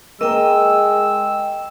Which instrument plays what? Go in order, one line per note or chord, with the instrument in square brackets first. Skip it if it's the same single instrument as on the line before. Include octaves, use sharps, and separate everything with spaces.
[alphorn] G#3 [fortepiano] A#3 [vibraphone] D#5 G5 [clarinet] E6